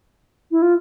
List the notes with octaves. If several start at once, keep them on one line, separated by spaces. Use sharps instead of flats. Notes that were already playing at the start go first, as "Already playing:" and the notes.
E4
F4